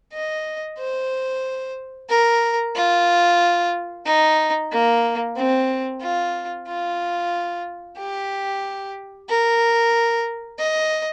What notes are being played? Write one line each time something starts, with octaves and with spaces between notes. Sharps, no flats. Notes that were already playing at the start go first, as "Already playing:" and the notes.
D#5
C5
A#4
F4
D#4
A#3
C4
F4
F4
G4
A#4
D#5